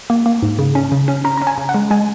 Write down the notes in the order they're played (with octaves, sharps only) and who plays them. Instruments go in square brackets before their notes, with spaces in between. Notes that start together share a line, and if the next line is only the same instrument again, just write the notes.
[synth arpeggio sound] A#3
A#3
G#2
C#3
C#4
C#3
C#4
C#4 A#5
C#4 A#5
G#5
C#3
F#5
G#3
G#3 G#5